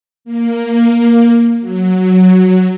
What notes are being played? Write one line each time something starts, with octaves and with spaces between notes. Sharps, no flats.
A#3
F#3